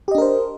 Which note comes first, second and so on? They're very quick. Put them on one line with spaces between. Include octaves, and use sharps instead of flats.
G4 D#5 D4 A#4 C5